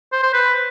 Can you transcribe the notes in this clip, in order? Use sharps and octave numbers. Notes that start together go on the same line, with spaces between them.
C5
C5
B4